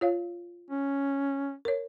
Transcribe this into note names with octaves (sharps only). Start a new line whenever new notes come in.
F4 C#5 F5
C#4
A#4 C#5